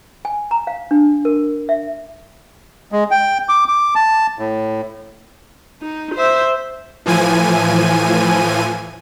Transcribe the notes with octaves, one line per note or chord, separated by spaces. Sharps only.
G#5
A#5
F5
D4
A#4
E5
G#3
G5
D6
D6
A5
A2
D#4
C5 E5
A2 E3 F3 G#5 D#7